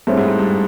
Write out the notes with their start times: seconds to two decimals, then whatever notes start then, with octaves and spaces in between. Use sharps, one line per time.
0.07 G2 A3 C4 E4 G#4 C#5
0.17 G#2
0.28 G#2
0.39 G2